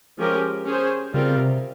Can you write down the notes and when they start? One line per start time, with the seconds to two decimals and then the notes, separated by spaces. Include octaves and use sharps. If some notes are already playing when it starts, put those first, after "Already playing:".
0.18 F3 G#3 C#4 G4 A#4
0.66 C#4 G#4 C5
1.13 C#3 G3 C4 F4 A#4
1.37 C3